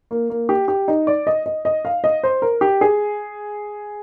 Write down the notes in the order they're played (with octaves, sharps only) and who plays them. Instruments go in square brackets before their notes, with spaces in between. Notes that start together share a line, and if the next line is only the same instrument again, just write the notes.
[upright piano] A#3
A#3
G4
G4
D#4
D5
D#5
D#5
D#5
F5
D#5
C5
A#4
G4
G#4